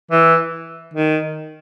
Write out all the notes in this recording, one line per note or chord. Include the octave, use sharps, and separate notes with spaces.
E3
D#3